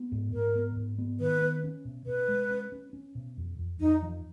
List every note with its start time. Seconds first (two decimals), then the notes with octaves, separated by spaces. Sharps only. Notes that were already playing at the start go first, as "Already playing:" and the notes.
Already playing: B3
0.12 G#2
0.33 G#2 A#4
0.55 B3
0.76 G#2
0.98 B3
1.20 D#3 B4
1.42 B3
1.64 C#4
1.85 B2
2.06 B2 B4
2.28 G#3
2.50 C#4
2.72 C#4
2.93 C#4
3.15 B2
3.37 F2
3.58 F2
3.80 F2 D#4
4.02 F3